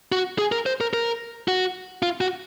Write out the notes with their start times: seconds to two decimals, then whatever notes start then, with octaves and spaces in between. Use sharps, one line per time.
0.12 F#4
0.38 G#4
0.52 A#4
0.66 C5
0.81 A#4
0.93 A#4
1.48 F#4
2.03 F4
2.21 F#4